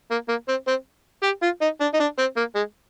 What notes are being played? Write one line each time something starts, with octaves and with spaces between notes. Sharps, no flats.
A#3
A#3
C4
C4
G4
F4
D#4
D4
D#4
D4
C4
A#3
G#3